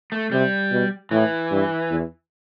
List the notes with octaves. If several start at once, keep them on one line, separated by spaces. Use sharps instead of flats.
A3
C3 G3
B2
A2 E3
G2
E2